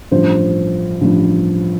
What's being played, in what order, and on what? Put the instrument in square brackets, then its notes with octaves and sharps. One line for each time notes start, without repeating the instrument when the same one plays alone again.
[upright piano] A1 G2 F3 C5
A1 G2 F3